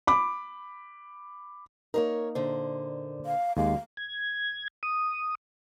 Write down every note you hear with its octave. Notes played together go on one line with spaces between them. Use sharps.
B5 D6
A#3 D#4 A#4 C5 C#5
A#2 D3 C5
F5
D#2 G#3 F5
G#6
D#6